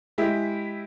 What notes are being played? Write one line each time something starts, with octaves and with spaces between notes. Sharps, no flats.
G#3 E4 G4